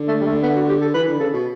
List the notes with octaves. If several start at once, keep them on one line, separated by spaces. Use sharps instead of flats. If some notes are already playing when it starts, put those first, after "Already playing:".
Already playing: D3
A3
G3
A3
B3
F#4
G4
A4
E3 B4
D3
C#3 A4
B2